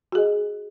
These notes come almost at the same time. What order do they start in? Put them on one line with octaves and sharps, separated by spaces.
F#4 G#4 D#5